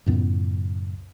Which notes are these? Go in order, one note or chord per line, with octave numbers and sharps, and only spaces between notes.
C#2 F#2 A2 B3